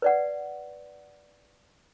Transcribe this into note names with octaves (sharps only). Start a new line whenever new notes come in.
B4 D5 F#5